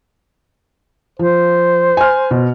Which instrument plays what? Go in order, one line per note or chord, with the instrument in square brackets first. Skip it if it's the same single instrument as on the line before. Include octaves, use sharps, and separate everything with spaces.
[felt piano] F3 [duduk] C5
[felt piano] G#5 F6
B2